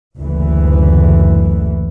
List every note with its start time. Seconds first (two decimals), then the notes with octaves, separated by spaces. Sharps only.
0.18 F#1 D2 E3